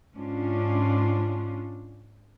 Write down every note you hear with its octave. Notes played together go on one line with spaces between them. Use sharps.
G#2 C#4 D4 F4